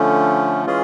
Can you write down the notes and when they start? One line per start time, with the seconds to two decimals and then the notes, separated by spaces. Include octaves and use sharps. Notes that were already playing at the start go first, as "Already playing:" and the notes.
Already playing: D3 F3 A3 C#4
0.66 E3 G#3 C#4 F4 G#4